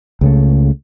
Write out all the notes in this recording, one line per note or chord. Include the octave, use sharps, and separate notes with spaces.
C#2 C#3 A3